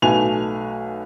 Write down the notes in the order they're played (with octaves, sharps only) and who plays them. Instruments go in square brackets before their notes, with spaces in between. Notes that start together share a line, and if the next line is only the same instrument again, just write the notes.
[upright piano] B1 A3 F#4 B4 G#5 F7